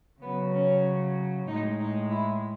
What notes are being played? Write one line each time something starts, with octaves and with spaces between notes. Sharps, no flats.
C#3 F#3 B3
C#4
A2 G#3 D#4
D#4
E4